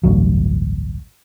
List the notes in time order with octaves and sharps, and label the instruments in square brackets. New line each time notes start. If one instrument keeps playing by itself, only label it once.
[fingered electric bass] A1 D2 G2 F#3